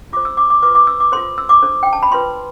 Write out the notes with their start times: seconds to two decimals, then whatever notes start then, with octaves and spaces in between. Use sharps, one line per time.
0.13 F4 D6
0.17 C5
0.25 E6
0.37 D6
0.50 D6
0.62 F4 B4 D6
0.75 D6
0.87 E6
1.00 D6
1.12 F4 A4 C5 C6
1.38 E6
1.49 D6
1.62 D4 A4 C5
1.83 G5
1.93 A5
2.03 B5
2.12 F4 B4 C6